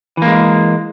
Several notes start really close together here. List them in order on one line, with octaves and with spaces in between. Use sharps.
E3 A#3 G#3